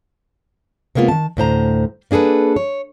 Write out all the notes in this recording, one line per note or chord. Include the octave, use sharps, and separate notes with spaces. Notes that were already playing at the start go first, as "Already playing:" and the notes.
C3 G#3 A#3 B3 F4
D#3 A5
D2 A2 C5 A#5
A#3 D4 G#4 A4 B4
C#5